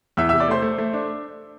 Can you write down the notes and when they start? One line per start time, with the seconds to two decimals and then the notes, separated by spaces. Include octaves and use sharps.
0.17 E2 E5 E6
0.29 C3 E5 E6
0.40 D5 D6
0.48 A3 C5 C6
0.62 A3
0.78 A3
0.93 D4